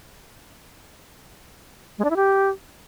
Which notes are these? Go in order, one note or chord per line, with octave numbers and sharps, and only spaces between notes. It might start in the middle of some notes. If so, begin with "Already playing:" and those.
G#3
D4
E4
G4